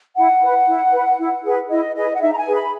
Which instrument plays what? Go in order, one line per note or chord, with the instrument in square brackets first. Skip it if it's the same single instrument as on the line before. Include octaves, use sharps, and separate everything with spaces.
[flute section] E4 F#5
B4
E4
B4
E4
G#4 B4
E4 D#5
G#4 B4 D#5
F#5
D#4 E5
A#5
G#5
G#4 B4
B5